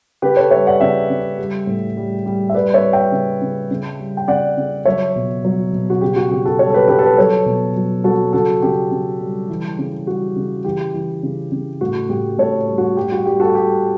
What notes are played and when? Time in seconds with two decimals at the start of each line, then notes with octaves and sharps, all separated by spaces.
0.22 C#3 G4 B4
0.37 A4 C#5
0.51 G3 C#5 E5
0.67 D5 F#5
0.80 C#3 E5 G5
1.10 C#3
1.38 G3
1.67 A2
1.97 G3
2.26 G3
2.49 E5
2.54 G3 B4 D5
2.74 C#5 E5
2.84 G3
2.93 E5 G5
3.12 C#3
3.42 C#3
3.71 C#3
3.99 G3
4.17 G5
4.28 C#3 D5 F#5
4.57 C#3
4.85 F#3 C#5 E5
5.16 B2
5.45 F#3
5.73 B2
5.90 F#4
6.01 C#3 G4
6.16 F#4
6.31 C#3 G4
6.45 F#4 A4
6.59 G3 A4 C#5
6.70 A4
6.74 G4 B4
6.88 C#3 G4 B4
6.99 A4
7.03 G4 B4
7.17 F#3 A4 C#5
7.46 B2
7.76 F#3
8.04 F#3 F#4 A4
8.33 C#3 F#4 A4
8.62 C#3 G4
8.91 C#3
9.21 G3
9.50 E3
9.79 C#3
10.07 G3 F#4
10.36 C#3
10.65 E3 G4
10.94 E3
11.23 C#3
11.52 C#3
11.81 A2 F#4
12.09 A2 G4
12.38 A2 A4 C#5
12.68 G3
12.78 F#4
12.97 G3 G4
13.12 F#4
13.26 G3 G4
13.40 F#4 A4
13.55 G3 G4